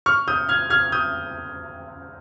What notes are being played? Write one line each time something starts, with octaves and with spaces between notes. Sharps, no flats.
C#6 F6
D#6 G6
F6 G#6
F6 G#6
D#6 G6